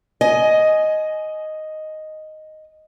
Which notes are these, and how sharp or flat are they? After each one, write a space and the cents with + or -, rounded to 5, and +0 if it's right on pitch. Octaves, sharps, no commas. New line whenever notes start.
D#5 +0 G#5 +15